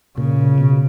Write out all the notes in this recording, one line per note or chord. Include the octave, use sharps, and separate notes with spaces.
A#2 C#3
B2